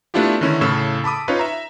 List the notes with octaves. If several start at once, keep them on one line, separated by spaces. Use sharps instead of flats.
A3 B3 D4 E4 F4 G4
D3 D#3 B3 C#4 E4
A2 C#3 A4 E6
A5 B5 D6 D#6
C#4 D#4 F4 B4 C#5
E5 A#5